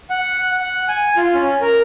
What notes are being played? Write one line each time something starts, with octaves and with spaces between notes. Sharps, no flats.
F#5
F#5
G#5
F4
C#4
A#4